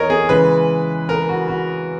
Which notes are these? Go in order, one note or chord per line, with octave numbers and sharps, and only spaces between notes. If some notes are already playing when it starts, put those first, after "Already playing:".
Already playing: E2 A#4 C#5 D#5
G#4
C#3 E3 G#3 B4
A#4
F#4
F#4